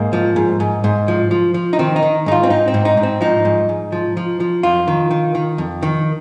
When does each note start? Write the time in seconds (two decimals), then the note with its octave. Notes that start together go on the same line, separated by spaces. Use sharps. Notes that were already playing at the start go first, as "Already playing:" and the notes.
Already playing: G#2 A#3
0.13 F3
0.36 G#2
0.60 G#2
0.84 G#2
1.08 F3
1.31 F3
1.54 F3
1.73 D#4
1.79 D#3 C4
1.96 D#4
2.02 D#3
2.26 G#2 D#4
2.32 F4
2.43 C4
2.50 G#2 D#4
2.68 C4
2.74 G#2
2.85 D#4
2.97 G#2
3.03 C4
3.21 F3 D#4
3.45 G#2
3.69 G#2
3.92 F3
4.17 F3
4.40 F3
4.63 F2 F4
4.88 D#3
5.11 D#3
5.35 D#3
5.58 F2
5.83 D#3